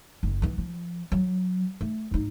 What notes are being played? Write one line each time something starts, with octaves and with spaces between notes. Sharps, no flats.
F#1
E3 B3
F3
F#3
A3
G#1 D#4